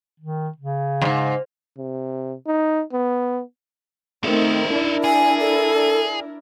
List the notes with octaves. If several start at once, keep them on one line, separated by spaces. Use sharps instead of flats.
D#3
C#3
F2 G#2
C3
D#4
B3
D#3 A3 C4 D#4 E5
D4 E4 A#4
G#4 G#5
A4